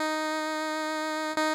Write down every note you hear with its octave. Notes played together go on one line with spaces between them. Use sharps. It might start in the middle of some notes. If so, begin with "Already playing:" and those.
Already playing: D#4
D#4